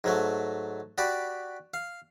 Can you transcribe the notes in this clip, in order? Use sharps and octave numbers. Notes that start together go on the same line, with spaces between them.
G#2 F#3 A3
F#4 G4 D5 B5
F5